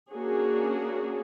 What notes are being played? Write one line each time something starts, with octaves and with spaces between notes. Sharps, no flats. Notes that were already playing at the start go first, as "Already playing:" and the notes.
A#3 C#4 D4 F#4 G#4